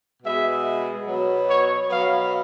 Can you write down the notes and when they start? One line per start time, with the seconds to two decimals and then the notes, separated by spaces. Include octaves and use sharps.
0.23 B2 G#3 B3 E5
1.06 B2 F#3 B3
1.48 C#5
1.89 B2 F#3 B3 F5